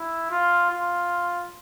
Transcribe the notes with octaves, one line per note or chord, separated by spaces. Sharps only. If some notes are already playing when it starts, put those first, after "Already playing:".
Already playing: E4
F4
F4